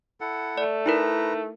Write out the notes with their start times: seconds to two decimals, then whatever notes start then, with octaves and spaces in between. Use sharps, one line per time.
0.21 E4 A4 F#5
0.58 A3 D5
0.86 D#4 E4 A#4 B4 A#5